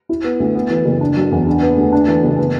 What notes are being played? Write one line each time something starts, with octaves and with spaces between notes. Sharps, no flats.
E4
B3
D2
B3
E3
F#1
D4
F#3
E2
D4
B3
D2
D4
E3
F#1
B3